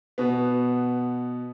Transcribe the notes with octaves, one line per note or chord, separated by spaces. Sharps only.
B2 B3